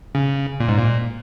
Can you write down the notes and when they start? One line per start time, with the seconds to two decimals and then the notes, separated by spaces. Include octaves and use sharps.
0.15 C#3
0.60 A#2
0.68 G#2
0.78 A#2